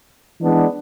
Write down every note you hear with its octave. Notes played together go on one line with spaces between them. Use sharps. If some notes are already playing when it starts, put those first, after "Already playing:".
E3 G#3 B3 D4